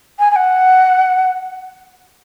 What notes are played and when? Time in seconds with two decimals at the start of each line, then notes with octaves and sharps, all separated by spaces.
0.19 G#5
0.31 G#5
0.35 F#5